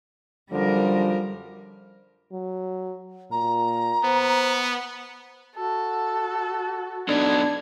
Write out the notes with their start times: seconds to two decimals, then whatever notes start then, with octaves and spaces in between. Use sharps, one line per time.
0.51 F#2 D3 F3 G3 A#4
2.32 F#3
3.31 A#2 A#5
4.04 B3 C5
5.56 F#4 A4
7.09 B3 D4 D#4 A4 G#6